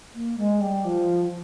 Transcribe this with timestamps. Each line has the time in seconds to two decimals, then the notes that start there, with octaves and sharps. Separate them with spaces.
0.14 A#3
0.38 G#3
0.60 G3
0.84 F3